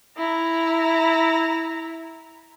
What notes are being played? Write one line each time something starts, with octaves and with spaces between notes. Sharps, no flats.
E4 A#5